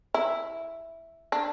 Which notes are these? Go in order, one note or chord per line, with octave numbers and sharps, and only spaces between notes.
E4
D4